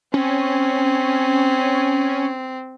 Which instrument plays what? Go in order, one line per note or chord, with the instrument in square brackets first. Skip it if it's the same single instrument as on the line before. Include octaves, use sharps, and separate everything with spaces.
[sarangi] C4 [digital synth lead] C#4